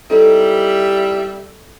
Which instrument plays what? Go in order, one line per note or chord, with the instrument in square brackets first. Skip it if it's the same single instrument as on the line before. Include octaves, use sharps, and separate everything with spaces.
[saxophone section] G3 [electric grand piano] C4 D#4 E4 [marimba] A4 [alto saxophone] E5